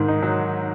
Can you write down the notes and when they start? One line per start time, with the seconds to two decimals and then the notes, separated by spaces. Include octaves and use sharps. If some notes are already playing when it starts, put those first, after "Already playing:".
Already playing: G#2 D#3
0.08 D#4
0.22 F#3